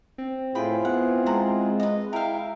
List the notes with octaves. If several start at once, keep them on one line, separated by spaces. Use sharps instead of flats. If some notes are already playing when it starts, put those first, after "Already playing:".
C4
A2 E4 F4 G#4 B4 G5 B5
B3 F#5
G#3 C5 F#5 A#5
B4 D#5
E4 A#4 E5 F5 G5